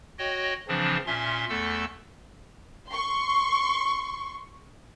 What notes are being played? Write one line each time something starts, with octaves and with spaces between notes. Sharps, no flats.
F#4 C#5 D#5 G5
C#3 E3 F3 C4 D4
A#2 C#4 E5 C6
E2 A3 A4 E6
C6 C#6